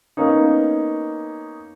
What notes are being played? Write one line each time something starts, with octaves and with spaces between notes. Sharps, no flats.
A#3 B3 C#4 D#4